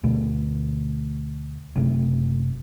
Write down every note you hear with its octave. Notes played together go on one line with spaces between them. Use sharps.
D2 B2 A3
F#1 C3 A3